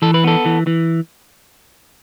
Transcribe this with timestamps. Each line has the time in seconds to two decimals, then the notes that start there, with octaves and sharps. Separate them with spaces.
0.02 E3 A4
0.14 B4
0.24 B3 A4
0.46 E3
0.67 E3